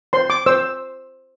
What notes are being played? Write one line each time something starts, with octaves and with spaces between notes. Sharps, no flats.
C5 C6
D6
C5 E6